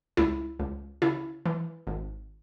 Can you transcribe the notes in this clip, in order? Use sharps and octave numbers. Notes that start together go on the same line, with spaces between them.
C#2 E4
C#2
C#3 E4
E3
G#1